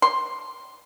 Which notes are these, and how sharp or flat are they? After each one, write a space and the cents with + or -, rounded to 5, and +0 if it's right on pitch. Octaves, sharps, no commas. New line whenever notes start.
C6 +5